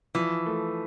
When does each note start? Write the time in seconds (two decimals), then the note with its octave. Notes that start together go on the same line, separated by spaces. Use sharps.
0.15 E3 F3
0.46 A3